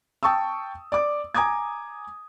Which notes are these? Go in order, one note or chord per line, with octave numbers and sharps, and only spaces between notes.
G5 A5 C#6 D#6 E6
D5 D6
G#5 A#5 D6 D#6 G#6